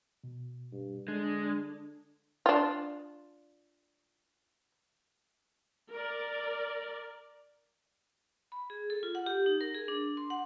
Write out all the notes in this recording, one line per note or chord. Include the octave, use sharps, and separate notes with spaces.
B2
G2
D3 G#3 D4 A6
D4 F4
A#4 D5
B5
G#4
A4
F4
F#5
G4
D#4
A#4
G#4
D4
C6
F#5